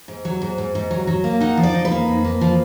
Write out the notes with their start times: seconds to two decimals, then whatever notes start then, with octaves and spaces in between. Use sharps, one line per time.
0.08 G#2
0.25 F#3
0.42 G#2
0.58 G#2
0.75 G#2
0.91 F#3
1.07 F#3
1.24 A#3
1.40 D#4 F#5
1.57 F3
1.63 D5
1.75 D#4
1.85 B4
1.91 A#3
2.08 F2
2.24 A#3
2.41 F3